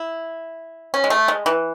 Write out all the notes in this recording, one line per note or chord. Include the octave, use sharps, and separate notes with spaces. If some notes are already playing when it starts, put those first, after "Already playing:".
Already playing: E4
C#4
G#3
A3
G#3
E3